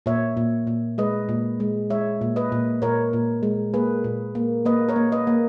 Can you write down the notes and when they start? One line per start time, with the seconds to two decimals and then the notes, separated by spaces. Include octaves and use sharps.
0.06 A#2 C#5 E5
0.37 A#2
0.67 A#2
0.98 G#3 B4 D#5
1.29 A#2
1.60 G#3
1.90 G#3 C#5 E5
2.21 A#2
2.36 B4 D#5
2.52 A#2
2.82 A#2 A#4 C#5
3.13 A#2
3.43 G#3
3.74 A#3 G#4 B4
4.04 A#2
4.35 A#3
4.65 A#3 B4 D#5
4.89 A#4 C#5
4.96 A#3
5.12 B4 D#5
5.27 A#3